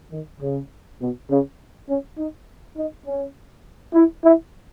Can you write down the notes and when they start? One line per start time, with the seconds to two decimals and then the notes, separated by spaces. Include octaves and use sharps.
0.12 D#3
0.40 C#3
1.00 B2
1.30 C#3
1.88 C#4
2.17 D#4
2.77 D#4
3.05 C#4
3.94 E4
4.24 E4